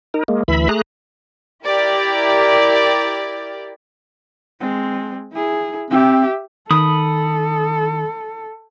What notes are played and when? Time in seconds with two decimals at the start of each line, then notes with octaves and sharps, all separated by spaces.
0.14 D#4 A#4
0.28 G#3 A#3
0.48 D2 E3 E5 B5
0.69 A3 G#4 A#5 F#6
1.66 E4 G4 A#4 D5
4.60 G#3 C4
5.32 E4 G#4
5.91 C4 G4 E5
6.71 D#3 A4 B5 D#6